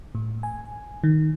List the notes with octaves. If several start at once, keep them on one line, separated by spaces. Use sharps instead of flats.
A2
G#5
D#3